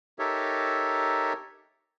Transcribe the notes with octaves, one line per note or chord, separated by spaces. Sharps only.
D#4 G4 A4 A#4 C#5 E5